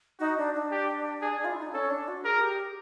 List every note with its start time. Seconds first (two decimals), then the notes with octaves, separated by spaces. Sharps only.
0.20 D#4 F#4
0.38 D4
0.54 D4
0.71 G4
1.22 G#4
1.45 F4
1.52 E4
1.59 D#4
1.66 D4
1.73 C#4 A4
1.90 D4
2.08 F#4
2.24 G#4 A#4
2.41 G4